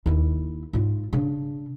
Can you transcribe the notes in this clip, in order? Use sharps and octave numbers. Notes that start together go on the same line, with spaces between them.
D#2 E4
G#2 F4
C#3 D4